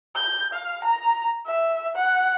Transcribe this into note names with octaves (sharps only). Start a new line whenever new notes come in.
G6
F5
A#5
E5
F#5